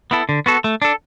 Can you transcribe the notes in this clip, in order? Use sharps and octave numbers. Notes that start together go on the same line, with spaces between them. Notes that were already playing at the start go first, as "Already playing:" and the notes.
B3 E4 A4
D3
B3 F#4 A4
A3
D4 A4